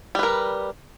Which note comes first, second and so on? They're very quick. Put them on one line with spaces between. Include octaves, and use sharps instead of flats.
G3 B4 A#4